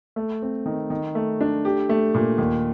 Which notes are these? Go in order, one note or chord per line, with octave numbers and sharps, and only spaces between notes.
A3
C4
D#3
D#3
A3
D4
G4
A3
A#2
D#2